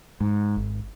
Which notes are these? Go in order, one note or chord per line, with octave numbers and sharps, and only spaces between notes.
G#2
G#1